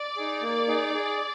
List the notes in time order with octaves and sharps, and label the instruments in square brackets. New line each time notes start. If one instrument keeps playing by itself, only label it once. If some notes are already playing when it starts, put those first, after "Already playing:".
Already playing: [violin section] D5
[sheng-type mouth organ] D#4 G#4
A#3
D#4 G#4
G#4